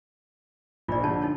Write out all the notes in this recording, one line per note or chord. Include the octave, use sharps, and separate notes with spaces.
A#1 F4 D5
D3 C#5 A5
D#4 A4 C#5